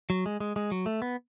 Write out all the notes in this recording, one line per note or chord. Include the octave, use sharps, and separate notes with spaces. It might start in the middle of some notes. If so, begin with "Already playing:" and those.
F#3
G#3
G#3
G#3
F#3
A3
B3